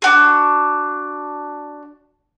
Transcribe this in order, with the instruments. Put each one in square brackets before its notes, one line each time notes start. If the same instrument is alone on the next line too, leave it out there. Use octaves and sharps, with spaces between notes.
[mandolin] D4 F#4 G#4